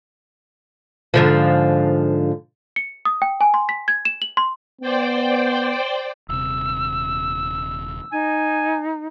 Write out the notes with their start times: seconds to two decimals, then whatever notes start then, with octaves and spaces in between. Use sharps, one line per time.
1.14 G#2 D3 F3
2.76 C#7
3.05 D#6
3.22 G5
3.41 G#5
3.54 C6
3.69 B6
3.88 G#6
4.05 E7
4.22 F#7
4.37 C6
4.81 B3 C5 D5 G5
6.29 D#1 C3 E6
8.12 D#4 G#5